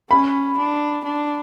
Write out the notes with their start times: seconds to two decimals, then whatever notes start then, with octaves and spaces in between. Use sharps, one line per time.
0.10 C#4 B5
0.58 D4
1.04 D4